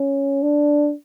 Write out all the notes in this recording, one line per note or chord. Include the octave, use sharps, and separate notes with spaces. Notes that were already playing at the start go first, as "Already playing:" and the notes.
Already playing: C#4
D4